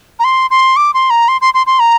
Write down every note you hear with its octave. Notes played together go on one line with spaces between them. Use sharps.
A#5
C6
C6
D6
C6
A#5
C6
C6
C6
C6
A#5